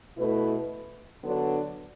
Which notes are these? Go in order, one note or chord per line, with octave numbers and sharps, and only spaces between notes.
B2 A3 E4 B4
D3 F#3 B3 D4